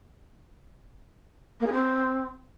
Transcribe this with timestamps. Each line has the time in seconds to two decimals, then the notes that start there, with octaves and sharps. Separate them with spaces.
1.60 A#3
1.66 G#4
1.72 C4